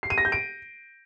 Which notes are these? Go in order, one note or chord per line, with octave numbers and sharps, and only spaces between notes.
C7
D#7
A#6
G6
D7